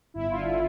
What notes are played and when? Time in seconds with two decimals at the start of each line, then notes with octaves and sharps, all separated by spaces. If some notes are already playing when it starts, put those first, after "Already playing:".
0.14 G1 E4
0.30 F4
0.36 D3
0.46 F4